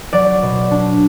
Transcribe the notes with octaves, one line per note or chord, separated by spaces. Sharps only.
F#3 D5
B2
D4